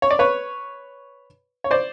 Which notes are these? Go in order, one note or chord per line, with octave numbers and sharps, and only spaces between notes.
C#5
D5
B4 C#5
C#5
C5 D5